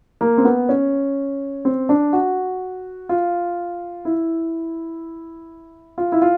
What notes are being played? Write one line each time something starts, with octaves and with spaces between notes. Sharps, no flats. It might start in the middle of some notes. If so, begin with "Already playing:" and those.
A#3
C4
B3
C#4
C4
D4
F#4
F4
E4
F4
E4
F4